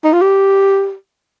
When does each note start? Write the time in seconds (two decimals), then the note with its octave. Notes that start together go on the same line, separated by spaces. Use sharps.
0.04 D#4
0.13 F4
0.22 G4